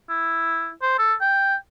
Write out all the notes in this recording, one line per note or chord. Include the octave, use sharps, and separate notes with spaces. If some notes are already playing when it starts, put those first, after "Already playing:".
E4
C5
A4
G5